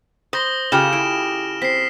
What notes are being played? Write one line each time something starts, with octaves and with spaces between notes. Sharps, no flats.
C5 D#6 A#6 G7
C#3 F4 G4 A4 A#5 F6 E7
E4 D7
C4 B6 C7